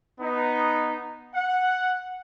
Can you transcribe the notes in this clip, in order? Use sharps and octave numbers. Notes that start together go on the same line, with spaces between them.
B3 D#4
F#5